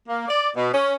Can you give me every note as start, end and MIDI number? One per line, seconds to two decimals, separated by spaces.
0.08 0.26 58
0.28 0.50 74
0.56 0.72 47
0.74 0.95 61